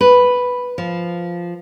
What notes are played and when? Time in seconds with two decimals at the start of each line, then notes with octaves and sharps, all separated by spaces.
0.01 B4
0.78 F3